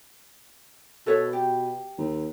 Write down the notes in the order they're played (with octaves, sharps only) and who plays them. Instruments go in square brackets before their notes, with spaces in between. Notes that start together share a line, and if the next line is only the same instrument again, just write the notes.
[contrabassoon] B2 [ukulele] A4 B4 C#5
[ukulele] G4
[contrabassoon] D#2